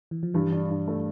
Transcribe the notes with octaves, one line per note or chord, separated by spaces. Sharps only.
E3
F3
G2 E3 G3
D4
G2
A3